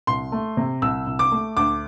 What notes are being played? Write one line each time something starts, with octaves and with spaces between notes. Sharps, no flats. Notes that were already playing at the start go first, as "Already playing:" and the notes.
C2 C6
A3
C3
C2 E6
C2
D6
A3
D2 D6